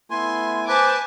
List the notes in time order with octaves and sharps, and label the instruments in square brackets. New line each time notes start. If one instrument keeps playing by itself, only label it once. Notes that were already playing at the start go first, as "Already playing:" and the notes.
[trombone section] A3 B3 E4 [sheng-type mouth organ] G#5 [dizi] C6
[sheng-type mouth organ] B4 [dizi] C5 [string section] G#5 A5 D6